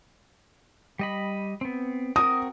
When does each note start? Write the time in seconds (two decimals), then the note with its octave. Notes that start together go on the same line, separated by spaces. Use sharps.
0.99 G3 D#5 B5
1.61 B3 C4
2.16 C4 F#4 A#4 D#6